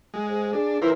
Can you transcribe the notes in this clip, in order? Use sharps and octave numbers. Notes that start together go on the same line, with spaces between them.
G#3
G#2
D4 G#4
E3 E4 A#4 C5